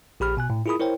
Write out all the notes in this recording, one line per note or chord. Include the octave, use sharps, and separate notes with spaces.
A#1 G4 B5 F6
B2 G#5 F#6
A2
E4 F4 G#4 A#4 B5 D#6
E4 A#4 C5 C#5 G5